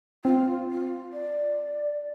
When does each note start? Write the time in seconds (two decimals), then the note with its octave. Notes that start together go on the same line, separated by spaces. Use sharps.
0.25 C4 F4
0.71 F4
1.13 D5